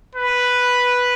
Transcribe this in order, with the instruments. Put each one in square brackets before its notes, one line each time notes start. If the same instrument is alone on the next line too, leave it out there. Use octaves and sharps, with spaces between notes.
[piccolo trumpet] B4